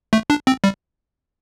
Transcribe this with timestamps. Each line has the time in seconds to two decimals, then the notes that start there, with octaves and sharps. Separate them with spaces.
0.13 A3
0.30 D4
0.47 C4
0.64 G3